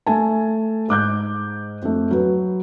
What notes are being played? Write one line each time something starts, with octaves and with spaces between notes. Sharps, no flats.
A3 G#5 A5
G#2 D6 F#6 G6
F2 A3
F#3 B4